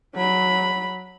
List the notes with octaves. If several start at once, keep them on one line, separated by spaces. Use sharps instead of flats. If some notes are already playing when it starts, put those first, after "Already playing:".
F#3 B5